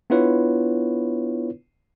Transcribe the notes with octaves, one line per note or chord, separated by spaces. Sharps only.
B3 D4 E4 F4 B4 C#5